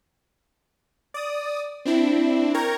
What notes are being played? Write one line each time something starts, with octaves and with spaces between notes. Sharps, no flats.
D5 D#6
C4 D4 E4
A#4 G5 A#5 C#6 G#6